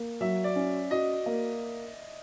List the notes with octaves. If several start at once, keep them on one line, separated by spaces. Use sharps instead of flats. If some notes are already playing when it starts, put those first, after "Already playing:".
Already playing: A#3
F#3 E5
D5
C#4
F#4 D#5
A#3